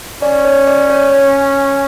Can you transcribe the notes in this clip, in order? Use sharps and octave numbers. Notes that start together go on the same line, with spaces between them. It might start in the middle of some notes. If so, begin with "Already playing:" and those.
C#4 D5
C#5
D5
C#5